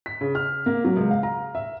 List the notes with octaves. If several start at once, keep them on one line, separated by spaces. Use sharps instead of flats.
B6
C#3
F6
A#3
F#3
C#2
F5
A#5
E5